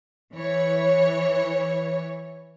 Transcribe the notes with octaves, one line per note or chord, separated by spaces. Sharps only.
E3 C#5